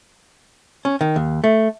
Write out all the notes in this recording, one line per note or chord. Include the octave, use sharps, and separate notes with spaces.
C#4
D#3
D#2
A3